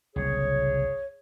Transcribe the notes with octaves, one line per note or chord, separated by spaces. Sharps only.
F#1 C2 G#4 C#5